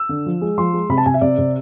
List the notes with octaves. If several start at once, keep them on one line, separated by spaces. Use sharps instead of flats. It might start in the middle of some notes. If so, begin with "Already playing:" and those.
Already playing: E6
D3
F3
G#3
F3 C6
G#3
C3 B5
A5
C3 G#5
E5
C3 D5
C3